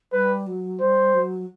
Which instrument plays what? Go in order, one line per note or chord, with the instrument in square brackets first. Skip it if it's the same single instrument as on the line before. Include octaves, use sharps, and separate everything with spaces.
[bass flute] G3 [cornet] B4
[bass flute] F#3
[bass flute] G3 [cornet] C5
[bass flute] F#3